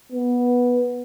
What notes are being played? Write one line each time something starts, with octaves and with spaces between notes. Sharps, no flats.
B3